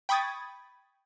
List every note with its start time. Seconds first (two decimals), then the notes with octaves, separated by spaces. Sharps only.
0.09 G5 B5 C#6 D#6 G#6 A6